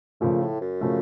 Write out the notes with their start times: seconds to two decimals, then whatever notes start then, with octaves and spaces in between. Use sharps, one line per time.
0.21 A#2 C#3 F3 A3
0.40 A2
0.61 F#2
0.81 C#3 F3 A3